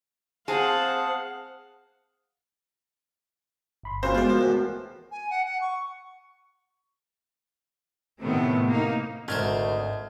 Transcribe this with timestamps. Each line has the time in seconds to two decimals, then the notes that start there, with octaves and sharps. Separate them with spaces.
0.48 C4 G#4 C5 F5 F#5 A5
3.83 G1 B5 C6
4.03 F2 A#2 C#3 F#4 C5
4.15 G#3 A3 B3 F4 D5
4.29 F3 F#4 A#4
4.41 E2 A2
5.11 G#5
5.30 F#5
5.45 F#5
5.61 C#6
8.20 A2 C3 D#3 A3 B3
8.68 A#3 D#4
9.28 G#1 D2 A3 A#4 C5 D#5 F6 G#6